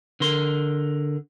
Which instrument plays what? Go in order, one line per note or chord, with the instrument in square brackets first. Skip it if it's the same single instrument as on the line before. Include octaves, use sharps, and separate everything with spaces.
[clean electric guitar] D3 A#4 C6